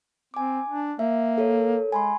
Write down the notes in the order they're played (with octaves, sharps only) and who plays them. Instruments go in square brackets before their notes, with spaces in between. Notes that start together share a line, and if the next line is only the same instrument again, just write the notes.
[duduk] C4 [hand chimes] G#5 D6
[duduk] D4
[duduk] A#3 [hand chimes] E5
[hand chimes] A4 A#4 C#5
[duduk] G#3 [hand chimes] G#5 B5 C6